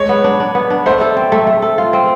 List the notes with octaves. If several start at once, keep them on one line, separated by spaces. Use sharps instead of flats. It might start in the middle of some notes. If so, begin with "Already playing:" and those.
Already playing: G#3 C#5
B3
D4
D4
B3
D4
A3 C5
A4
C4
A3
A3
A4
F4
C4